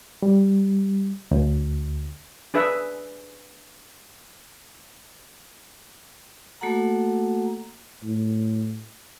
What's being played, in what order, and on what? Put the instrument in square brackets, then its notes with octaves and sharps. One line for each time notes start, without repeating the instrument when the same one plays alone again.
[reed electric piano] G3
D2
[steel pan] D4 G#4 B4 E5
[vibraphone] A3 A#3 F#4 A4 F#5 A#5
[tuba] A2